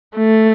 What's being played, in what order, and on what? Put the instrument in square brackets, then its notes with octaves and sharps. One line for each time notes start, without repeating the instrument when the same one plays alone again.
[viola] A3